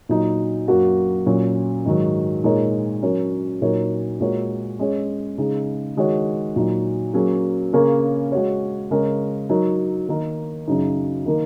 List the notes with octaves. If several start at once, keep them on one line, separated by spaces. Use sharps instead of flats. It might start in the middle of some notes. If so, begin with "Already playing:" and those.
A#2 F#3 D#4
F#2 F#3 A#3 F#4
A#2 F#3 C#4
G#2 D#3 F#3
A#2 G#3 D#4 A#4 C#5
F#3 C#4 A#4 C#5
A#2 F#3 D#4 A#4 C#5
A#2 G#3 F#4 A#4 C#5
G#3 C#4 G#4 C#5
C#3 G#3 D#4
D#3 G#3 F#4 C#5
A#2 F#3 D#4
F#3 A#3 C#4 G#4
C#3 A#3 C#4 A#4 C#5
G#3 F#4 C#5
C#3 G#3 C#4 A#4
F#3 D#4 A#4 C#5
D#3 A#3 D#4 A#4
F#2 C#3 F#3 D#4
D#3 A#3 D#4 A#4